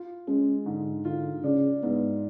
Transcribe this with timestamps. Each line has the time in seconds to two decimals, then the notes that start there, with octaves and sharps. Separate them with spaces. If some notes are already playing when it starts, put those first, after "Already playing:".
Already playing: F4
0.27 G#3 C#4
0.66 G#2 D3
1.04 D3 F4
1.44 C#3 D4
1.83 G#2 B3